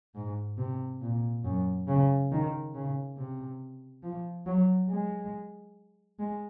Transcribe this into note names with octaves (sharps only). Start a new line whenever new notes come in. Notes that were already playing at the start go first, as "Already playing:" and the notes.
G#2
C3
A#2
F#2
C#3
D#3
C#3
C3
F3
F#3
G#3
G#3